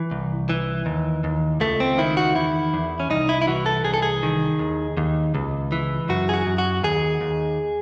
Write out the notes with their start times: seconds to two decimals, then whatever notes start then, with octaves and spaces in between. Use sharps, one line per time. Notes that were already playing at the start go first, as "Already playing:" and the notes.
Already playing: E3
0.11 C2
0.49 E3
0.86 D#2
1.24 D#2
1.60 C#2 A3
1.80 C4
1.98 D#3 E4
2.17 F#4
2.35 E2 E4
2.74 E2
3.00 C#4
3.10 C2 D#4
3.29 E4
3.42 E4
3.47 E3 F#4
3.66 A4
3.85 C2 G#4
3.94 A4
4.02 G#4
4.23 D#3
4.59 D#2
4.97 D#2
5.35 C#2
5.72 E3
6.09 F#2 F#4
6.29 G#4
6.34 F#4
6.47 F#2
6.58 F#4
6.83 D#2 G#4
7.21 D#2